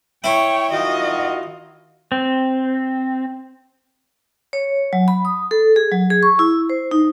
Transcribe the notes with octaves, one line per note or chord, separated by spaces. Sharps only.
E4 C#5 G5
D#3 F4 F#4 D#5
C4
C#5
F#3
B5
D#6
A4
G#4
F#3
G#4
C#6
E4
C5
D#4